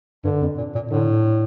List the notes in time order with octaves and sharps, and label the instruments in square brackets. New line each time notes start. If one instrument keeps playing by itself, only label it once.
[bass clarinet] G2 [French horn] D3
[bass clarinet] F2
A#2
A#2
[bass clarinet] A2 [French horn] D3